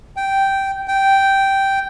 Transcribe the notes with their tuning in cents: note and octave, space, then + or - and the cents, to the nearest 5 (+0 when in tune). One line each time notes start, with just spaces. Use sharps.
G5 -5
G5 -5